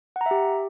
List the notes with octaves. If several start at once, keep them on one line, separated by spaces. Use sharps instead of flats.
F#5
A#5
E5
G4